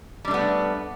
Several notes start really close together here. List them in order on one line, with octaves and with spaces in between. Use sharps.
G3 D4 A3 B3